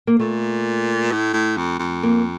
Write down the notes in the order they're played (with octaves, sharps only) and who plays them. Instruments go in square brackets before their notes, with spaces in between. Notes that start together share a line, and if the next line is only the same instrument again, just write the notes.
[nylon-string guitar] A#3
[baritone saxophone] A#2 [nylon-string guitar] A3
[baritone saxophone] A2
A2
F2
F2
[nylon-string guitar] A#3